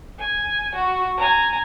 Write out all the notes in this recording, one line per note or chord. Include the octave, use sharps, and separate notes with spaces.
G#5
F#4
G#5 A#5